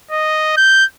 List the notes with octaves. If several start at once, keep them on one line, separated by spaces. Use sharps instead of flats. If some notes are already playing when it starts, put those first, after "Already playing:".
D#5
G6